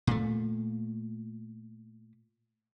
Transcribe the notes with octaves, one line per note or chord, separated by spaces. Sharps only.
A#2 A3